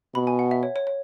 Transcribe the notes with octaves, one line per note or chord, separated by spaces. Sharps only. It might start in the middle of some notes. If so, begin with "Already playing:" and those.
B2 B5
G#5
F#5
E5
C#5
C#5
C#5